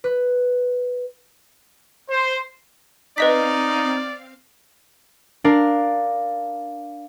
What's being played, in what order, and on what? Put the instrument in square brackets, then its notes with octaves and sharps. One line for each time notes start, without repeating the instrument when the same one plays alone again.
[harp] B4
[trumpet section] C5
[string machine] C4 F5 [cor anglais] D#4 [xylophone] B4 D#5 B6 [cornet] D5
[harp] D4 A#4 D5 F5